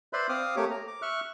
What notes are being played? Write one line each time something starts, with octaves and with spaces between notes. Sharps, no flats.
B4 C5 D5 E5 B5 C6
C4 F5 D6 D#6 F6
A3 A#3 G4 C#5 D6
A#5
D6
E5 C#6 F6 F#6